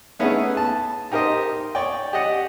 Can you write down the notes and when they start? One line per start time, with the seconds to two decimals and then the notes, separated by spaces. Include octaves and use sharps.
0.19 A3 B3 C#4 D#4 E4 G#4
0.57 A5
1.12 D#4 G4 A#4 C5 D#5
1.75 C#5 D5 G5
2.13 G4 D#5 F#5